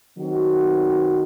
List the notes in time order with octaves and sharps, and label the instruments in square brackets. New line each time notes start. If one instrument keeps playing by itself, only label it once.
[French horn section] D#3 F#3 C4 F#4